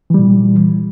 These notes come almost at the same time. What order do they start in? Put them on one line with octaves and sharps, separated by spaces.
E3 G3 A#2